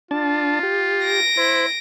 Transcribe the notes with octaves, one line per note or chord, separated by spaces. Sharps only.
D4 F4 A5
G4
A#6 D7
E4 C5